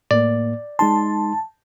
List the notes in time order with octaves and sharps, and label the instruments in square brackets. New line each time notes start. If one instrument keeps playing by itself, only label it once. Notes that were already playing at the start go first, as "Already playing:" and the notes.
[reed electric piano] A2 A#3 [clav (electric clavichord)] D5
[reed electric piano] G#3 D#4 C6 [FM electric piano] A5